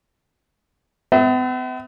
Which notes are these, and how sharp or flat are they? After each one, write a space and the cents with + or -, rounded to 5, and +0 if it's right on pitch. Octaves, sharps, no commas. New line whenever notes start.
B3 +45 E5 -25